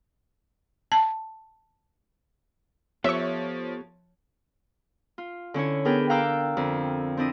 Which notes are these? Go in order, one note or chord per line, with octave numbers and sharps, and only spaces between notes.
A5
F3 B3 G4 A4 C#5 E5 C#6
F4
D3 C#4 E4 C#5
B3 D4 G#4 A#4 B4 G5
F5 G5 A#5 D6 E6 F#6
F2 D3
C4 D4 E4 D#5